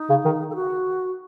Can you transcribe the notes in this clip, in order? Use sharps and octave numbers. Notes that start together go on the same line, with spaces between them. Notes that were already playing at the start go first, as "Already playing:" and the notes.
Already playing: D#4
C#3
D#3
A4
F#4